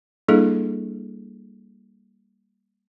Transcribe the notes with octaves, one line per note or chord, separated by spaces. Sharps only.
G3 A#3 D4 E4 G#4 A4